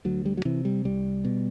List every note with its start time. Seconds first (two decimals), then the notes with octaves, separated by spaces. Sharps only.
0.05 D2 F#3
0.26 G3
0.37 F#3
0.45 C3 E3
0.65 G3
0.85 C2 G3
1.25 B2